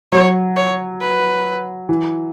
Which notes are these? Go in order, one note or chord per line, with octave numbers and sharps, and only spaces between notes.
F#3 C#5
C#5
B4
E3